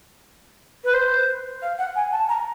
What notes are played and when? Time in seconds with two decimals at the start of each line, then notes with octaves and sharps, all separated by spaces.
0.84 B4
0.94 C5
1.62 F5
1.79 F#5
1.96 G#5
2.12 A5
2.29 A#5